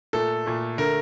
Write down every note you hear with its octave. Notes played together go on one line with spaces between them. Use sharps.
A#2 A3 A4
A#2 A3
D3 A3 A#4